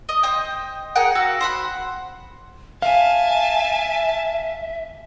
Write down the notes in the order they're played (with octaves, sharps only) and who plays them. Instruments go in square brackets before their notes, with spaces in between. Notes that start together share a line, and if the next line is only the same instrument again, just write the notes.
[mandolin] D#5
C5 D#5 G5
G#4 A#4 F#5 G5
F#4 F5 E6
C5 F#5 B5
[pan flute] E5 [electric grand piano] F5 [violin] G#5 A5